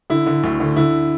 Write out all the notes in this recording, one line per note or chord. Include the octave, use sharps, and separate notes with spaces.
D3 E4
D3
D2
D3
D3 E4